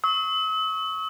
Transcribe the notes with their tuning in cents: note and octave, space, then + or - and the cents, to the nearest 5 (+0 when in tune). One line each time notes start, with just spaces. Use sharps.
C#6 +0 E6 -45